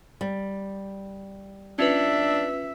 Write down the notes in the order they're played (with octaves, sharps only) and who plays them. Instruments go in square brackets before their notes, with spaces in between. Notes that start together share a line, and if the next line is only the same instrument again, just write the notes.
[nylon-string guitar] G3
[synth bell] C#4 F4 B4 [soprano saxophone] D4 [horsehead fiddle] E5